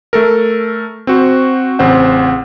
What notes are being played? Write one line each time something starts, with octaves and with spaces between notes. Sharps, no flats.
A3 A4 A#4
C4 F#4 C5
A1 C#3 C4 C5 F#5